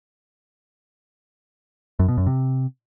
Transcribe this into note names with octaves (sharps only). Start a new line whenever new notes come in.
F#2
B2
F#2
C3